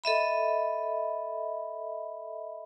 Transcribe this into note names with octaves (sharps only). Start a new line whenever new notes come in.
A4 D#5 E5 B5